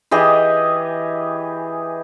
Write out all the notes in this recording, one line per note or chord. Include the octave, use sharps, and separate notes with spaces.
E3 G4 G#4 D#5